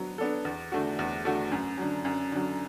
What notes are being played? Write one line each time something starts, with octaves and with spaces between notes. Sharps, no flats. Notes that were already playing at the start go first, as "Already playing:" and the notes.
Already playing: F#3 B3 D4
B3 D4 A4
E2
D3 A3 F#4
E2
D3 A3 F#4
F#2
D3 F#3
F#2
D3 F#3